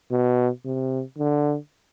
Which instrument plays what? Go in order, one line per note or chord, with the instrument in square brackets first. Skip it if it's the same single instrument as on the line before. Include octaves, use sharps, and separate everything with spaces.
[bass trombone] B2
C3
D3